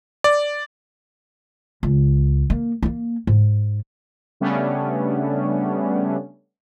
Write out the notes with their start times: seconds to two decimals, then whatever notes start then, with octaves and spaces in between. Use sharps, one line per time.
0.24 D5
1.83 C#2
2.50 A#3
2.83 A#3 B3
3.27 G#2
4.40 C#3 G3 A3 B3 C#4 D4